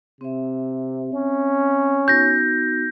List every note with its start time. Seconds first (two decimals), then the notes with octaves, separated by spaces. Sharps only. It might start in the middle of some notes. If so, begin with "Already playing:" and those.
0.21 C3 C4 E5
1.13 C#4
2.08 B3 D#4 F#4 G6 A#6